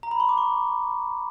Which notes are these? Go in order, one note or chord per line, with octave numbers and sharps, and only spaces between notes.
A#5
B5
C6
D6
C#6